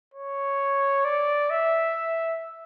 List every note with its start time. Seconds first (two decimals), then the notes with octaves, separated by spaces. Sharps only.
0.14 C#5
1.05 D5
1.50 E5